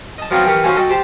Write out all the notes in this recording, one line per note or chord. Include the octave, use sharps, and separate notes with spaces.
D#5 A5
F3 F#3 B3 C4 D#4 F4
E3 G4 A#4 C#6
C#4 D#4 F#4 C5 F5 G#5
F#4 A4 D#5 G5
G4 C5 A5